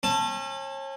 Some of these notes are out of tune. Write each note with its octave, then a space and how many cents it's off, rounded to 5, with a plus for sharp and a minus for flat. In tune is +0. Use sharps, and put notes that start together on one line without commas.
C#4 -35 A5 +5